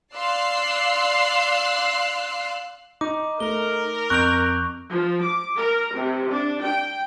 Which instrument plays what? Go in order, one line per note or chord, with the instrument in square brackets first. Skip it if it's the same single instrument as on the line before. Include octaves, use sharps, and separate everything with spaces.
[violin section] D5 F5 C6 E6 F#6 C7
[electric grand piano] D#4 [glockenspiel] D6
[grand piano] A3 [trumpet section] A#4 [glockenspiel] G7
[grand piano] F2 [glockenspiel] C#6 G6 F7 [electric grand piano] F#6 D7
[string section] F3
D6
A#4
C3
D4
G5